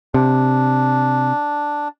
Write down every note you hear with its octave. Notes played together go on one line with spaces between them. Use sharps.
C3 D4